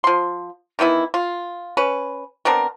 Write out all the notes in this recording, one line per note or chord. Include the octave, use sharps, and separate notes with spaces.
F3 C6
D#3 E3 B3 E4
F4
C#4 B4
B3 C4 D4 A#4